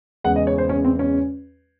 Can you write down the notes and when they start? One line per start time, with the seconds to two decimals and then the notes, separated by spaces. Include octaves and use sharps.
0.24 E2 C#3 G#3 F#5
0.36 D#5
0.47 C#5
0.58 C5
0.69 C#4
0.84 C4
0.99 C#4